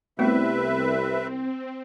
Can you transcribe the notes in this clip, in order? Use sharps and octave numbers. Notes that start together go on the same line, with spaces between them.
C2 A3 B3 C4 F#4 B4 E5